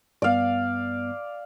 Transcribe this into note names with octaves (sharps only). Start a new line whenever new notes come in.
G2 B3 D5 F5